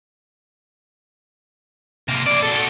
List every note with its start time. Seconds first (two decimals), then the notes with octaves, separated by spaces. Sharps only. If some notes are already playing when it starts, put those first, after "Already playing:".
2.08 C3 A#3
2.27 G#4 D5
2.43 B2 A4